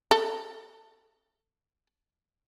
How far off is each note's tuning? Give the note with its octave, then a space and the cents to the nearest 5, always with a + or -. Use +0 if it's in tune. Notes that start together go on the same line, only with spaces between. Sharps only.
A4 +15